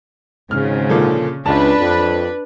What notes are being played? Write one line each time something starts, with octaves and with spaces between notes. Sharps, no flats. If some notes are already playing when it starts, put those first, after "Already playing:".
G#1 G#2 C#3 F6
A#2 D3 F3
C#2 D4 B4 A5
F2